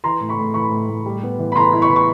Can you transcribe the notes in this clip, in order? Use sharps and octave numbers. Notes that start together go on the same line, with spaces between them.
E3 A#5 C6
A2
B5 C#6
A2
E3 B5 C#6
A2
A2
G3
B3
E3
B5
E3 A#5 C6
E4
B5 C#6
E3
C#6